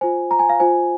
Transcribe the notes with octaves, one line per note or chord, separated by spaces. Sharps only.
F4 C5 G#5
A#5
G#5
F5
F4 C5 G#5